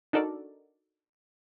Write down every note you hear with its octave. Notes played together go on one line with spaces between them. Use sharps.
D4 D#4 F#4 A4 A#4 D5